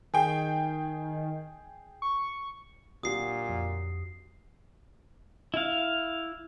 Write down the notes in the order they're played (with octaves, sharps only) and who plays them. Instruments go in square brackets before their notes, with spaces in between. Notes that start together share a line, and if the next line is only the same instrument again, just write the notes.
[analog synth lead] D#3 [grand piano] G#4 G5
[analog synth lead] C#6
[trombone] A#2 [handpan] D4 F#4 G4 [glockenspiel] D#6 C7
[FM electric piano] F2
[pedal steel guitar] E4 F5